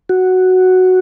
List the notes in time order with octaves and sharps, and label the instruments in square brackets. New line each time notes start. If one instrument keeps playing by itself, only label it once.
[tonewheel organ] F#4